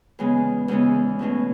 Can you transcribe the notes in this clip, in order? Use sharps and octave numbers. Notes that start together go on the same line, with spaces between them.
E2 C#3 G#3 B3
E2 C#3 G#3 B3
E2 B2 A3 C#4